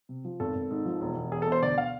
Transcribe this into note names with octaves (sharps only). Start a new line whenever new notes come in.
C3
F3
G#1 A4
G#1
G#2
F3
E1
E1
E2 G#4
A4
B2
C5
D2 D5
F5